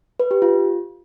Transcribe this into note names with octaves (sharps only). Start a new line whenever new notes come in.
B4
G4
F4